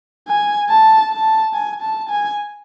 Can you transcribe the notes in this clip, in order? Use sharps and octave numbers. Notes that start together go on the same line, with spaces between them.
G#5
A5
A5
G#5
A5
G#5